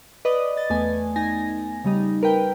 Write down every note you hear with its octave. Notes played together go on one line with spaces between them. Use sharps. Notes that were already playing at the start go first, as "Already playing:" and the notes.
B4 D5 D#5 D#6
D#5 A6
E2 A3 B3 G#5
D#4 G#5 A#6
C#3 G3 D#4
A#4 B4 G5